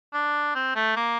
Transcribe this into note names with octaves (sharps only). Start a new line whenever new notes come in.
D4
C4
A3
A#3